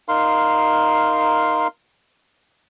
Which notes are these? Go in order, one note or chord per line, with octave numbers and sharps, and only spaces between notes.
D#4 A#4 F5 C6